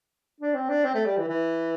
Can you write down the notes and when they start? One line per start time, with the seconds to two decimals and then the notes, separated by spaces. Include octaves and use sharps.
0.41 D4
0.55 C4
0.69 D4
0.85 C4
0.94 A3
1.06 G3
1.18 E3
1.28 E3